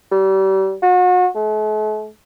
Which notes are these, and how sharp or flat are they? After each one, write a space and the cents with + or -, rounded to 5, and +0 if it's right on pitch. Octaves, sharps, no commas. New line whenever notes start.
G3 -35
F#4 -35
A3 -45